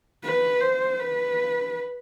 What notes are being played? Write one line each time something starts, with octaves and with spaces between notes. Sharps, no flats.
B4
C5
B4